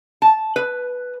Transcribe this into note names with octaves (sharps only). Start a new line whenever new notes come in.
A5
B4